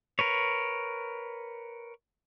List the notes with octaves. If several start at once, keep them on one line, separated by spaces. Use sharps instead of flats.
A#4 B4 C#5